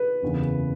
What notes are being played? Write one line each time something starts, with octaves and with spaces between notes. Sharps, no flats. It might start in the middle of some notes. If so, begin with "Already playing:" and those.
Already playing: B4
F#1 E2 C#3